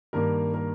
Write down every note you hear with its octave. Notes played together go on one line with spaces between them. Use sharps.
G2 D#3 A#3 A#4
A#4